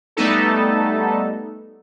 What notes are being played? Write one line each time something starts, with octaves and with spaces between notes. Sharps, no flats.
G3 A3 B3 D#4 A4